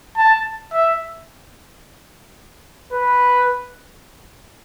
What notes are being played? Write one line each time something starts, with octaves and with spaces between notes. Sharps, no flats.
A5
E5
B4